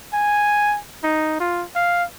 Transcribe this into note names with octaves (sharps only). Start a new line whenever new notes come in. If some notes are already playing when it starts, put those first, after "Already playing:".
G#5
D#4
F4
F5